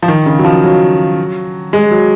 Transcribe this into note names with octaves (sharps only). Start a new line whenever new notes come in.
F3
D#3
C#3
F#3
F3
F#3
G#3
F#3